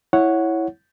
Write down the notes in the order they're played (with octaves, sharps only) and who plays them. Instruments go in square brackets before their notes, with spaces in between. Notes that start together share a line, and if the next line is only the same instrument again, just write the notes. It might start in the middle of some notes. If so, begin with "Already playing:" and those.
[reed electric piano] E4 C#5 F#5